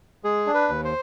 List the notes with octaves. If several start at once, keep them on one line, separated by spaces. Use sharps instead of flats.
G#3 G#4
D4
B4
D#2
C5